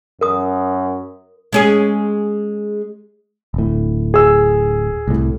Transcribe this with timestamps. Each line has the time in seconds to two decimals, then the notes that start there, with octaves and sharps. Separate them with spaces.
0.21 F#2 A#4 D#6
1.53 G#3 C#4 G#4
3.54 D1 A2
4.14 G#4 E6
5.08 C2 A2